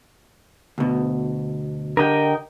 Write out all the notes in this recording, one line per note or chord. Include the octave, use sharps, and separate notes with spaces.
D2 B2
D3 G4 A#4 D#5 G5